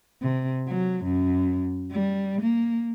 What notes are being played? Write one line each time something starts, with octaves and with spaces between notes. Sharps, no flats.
C3
F#3
F#2
G3
A#3